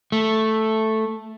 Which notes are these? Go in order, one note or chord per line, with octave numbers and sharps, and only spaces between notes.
A3